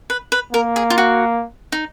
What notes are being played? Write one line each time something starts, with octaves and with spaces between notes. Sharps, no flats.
B4
B4
A#3 A#4
G#4
F4
F#4
D#4